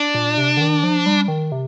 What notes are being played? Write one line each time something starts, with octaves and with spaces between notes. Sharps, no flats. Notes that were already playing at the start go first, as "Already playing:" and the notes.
Already playing: D4
A#2
C3
D3
D#3
F3
G3
D#3
C3